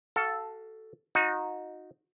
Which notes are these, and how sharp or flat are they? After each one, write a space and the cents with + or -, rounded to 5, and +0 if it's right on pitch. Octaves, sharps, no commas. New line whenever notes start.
F#4 +30 A4 +0 F5 -10
D#4 +0 F#4 -30